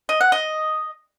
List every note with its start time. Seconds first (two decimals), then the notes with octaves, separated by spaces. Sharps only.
0.09 D#5
0.21 F#5
0.32 D#5